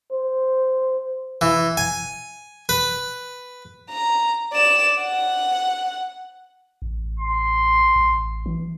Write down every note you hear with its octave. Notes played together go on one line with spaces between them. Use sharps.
C5
E3
G#5
B4
A#5
D5 E7
F#5
A1
C6
A1
E3